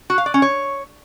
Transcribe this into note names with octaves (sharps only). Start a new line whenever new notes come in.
F#4
F5
D5
C#4
C#5